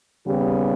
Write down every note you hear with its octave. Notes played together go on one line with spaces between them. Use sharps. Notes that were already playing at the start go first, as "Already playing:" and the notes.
D#2 C#3 G3 B3 G4